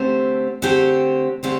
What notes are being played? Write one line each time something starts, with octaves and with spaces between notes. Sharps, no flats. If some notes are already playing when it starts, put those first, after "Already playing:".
Already playing: D3 A3 C4 G4 C5
D3 A3 C4 G4 C5
D3 A3 C4 G4 C5